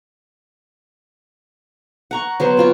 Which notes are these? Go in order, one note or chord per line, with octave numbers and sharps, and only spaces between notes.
F#5 A#5 C#6
F#3 B3 C5 C6
C4 F4 F#4